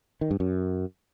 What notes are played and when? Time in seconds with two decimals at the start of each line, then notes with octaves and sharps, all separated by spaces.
0.21 D#3
0.31 G2
0.40 F#2